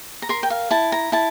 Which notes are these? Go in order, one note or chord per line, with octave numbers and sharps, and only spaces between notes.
A#5
A#4 C6
G5
F5
E4 A5
A#5
E4 A5